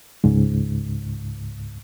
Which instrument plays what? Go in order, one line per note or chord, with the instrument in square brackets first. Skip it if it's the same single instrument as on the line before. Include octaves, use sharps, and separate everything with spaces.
[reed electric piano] C#2 G#2